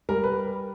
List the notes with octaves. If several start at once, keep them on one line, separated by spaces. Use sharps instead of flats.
G3 A#4
B4